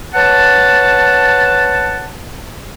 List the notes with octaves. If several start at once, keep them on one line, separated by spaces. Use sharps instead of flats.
B4 C#5 F#5 A5